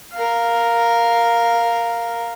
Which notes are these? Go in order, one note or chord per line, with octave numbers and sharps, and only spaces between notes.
A#4 F5